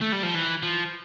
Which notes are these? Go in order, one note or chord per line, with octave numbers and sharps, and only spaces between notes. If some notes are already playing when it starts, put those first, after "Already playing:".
A3
G3
F3
E3
F3